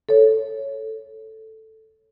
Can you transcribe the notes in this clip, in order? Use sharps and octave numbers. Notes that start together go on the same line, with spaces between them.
A4 C#5